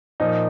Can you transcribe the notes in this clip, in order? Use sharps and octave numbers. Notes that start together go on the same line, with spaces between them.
A#2 F3 A#3 D#4